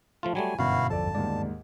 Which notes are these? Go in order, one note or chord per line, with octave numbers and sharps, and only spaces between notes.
F3 A3 F4
F#3 G3 A3 G#5
G1 F#2 B2 B3 E4 F#4 F5
A1 E2 F3 A4 D5 A5
D#2 G#2 D5